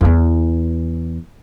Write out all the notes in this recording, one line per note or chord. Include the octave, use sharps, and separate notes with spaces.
E2 E3